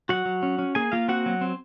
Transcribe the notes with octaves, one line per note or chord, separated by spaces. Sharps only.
F#3 F#4 F#5
F#3
C#4
C#4
A#3 G#4 G#5
A#3 F4 F5
C4 F#4 F#5
F#3
C4